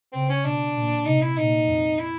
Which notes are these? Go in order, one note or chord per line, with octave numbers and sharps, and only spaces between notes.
C#3 C4
C#4
B2 D4
A#2
C3 D#4
E4
A#2 D#4
F2
E4